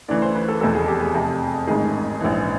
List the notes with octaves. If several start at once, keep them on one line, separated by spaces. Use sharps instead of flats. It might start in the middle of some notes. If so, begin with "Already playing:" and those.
D2 C#3 E3 D5
C5
B4
A4
F1 E2 B2 A4
G#4
G4
G#4
F1 F2 C3
A1 G#2 D#3 G#4
A#1 G#2 E3